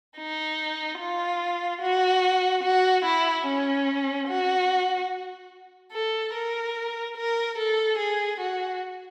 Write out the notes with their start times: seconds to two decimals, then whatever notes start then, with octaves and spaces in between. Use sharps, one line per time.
0.18 D#4
0.99 F4
1.82 F#4
2.63 F#4
3.05 E4
3.46 C#4
4.28 F#4
5.93 A4
6.34 A#4
7.17 A#4
7.58 A4
7.98 G#4
8.40 F#4